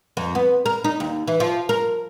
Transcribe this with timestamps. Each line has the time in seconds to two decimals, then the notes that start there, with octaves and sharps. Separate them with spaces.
0.17 F2
0.35 B3
0.66 A#4
0.84 D#4
1.00 D#2
1.27 E3
1.40 F3
1.69 A#4